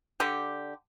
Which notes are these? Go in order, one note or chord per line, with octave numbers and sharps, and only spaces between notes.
D3 G4